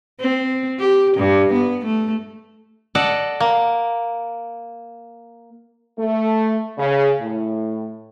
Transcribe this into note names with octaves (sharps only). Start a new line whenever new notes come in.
C4
G4
G2
B3
A3
A4 D5 D#5 F#5
A#3
A3
C#3
A2